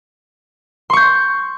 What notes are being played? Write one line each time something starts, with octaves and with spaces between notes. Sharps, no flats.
C6 C#6 G6